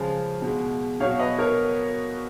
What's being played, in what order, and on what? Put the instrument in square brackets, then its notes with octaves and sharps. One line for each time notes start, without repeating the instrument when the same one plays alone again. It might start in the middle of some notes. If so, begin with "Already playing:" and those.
Already playing: [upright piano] C#3 F3 G#3 F5 G#5
B2 G#3
B2 F#3 C#5 F5
B4 D#5
A#4 C#5